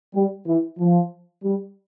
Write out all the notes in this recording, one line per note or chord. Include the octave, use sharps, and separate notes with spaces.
G3
E3
F3
G3